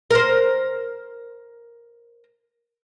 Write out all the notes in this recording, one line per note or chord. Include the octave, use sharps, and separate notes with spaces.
A#4 C5